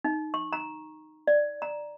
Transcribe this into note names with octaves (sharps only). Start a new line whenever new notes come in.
D#4
C#6
A#5
D5
A#5